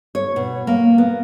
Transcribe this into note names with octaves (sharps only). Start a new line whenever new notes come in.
C#5
B2
A#3
B3